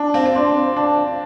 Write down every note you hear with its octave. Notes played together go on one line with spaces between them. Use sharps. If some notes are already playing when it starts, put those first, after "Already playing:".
Already playing: D4 A5
C4 F5
C4
D4 C6
C5
D4 A5
F5